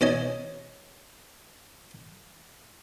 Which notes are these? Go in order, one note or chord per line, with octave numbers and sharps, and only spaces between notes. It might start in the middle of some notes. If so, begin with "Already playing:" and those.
B2 C#4 D#5 G#5